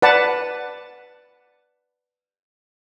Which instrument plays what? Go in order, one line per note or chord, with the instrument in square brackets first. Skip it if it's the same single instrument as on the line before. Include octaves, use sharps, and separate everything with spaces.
[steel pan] B4 D5 F#5 A5